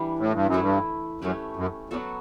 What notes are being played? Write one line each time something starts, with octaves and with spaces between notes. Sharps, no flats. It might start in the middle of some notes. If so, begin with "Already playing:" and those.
Already playing: E3 G3 D4
A2
G2
F#2
A3 E4 A4
G2
F#2 A3 C#4 G4 B4
F#2
E2 F#3 B3 F#4 A4